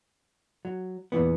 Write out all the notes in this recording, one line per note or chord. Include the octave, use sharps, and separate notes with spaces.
F#3
E2 A#2 E3 B3